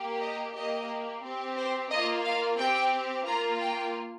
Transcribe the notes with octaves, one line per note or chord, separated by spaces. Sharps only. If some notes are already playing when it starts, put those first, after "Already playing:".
Already playing: A#3 G4
D#5
A#3 G4 D#5
C4 G4
C5
A#3 F4 D#5
F5
C4 G4 G5
A#3 F4 A#5
G5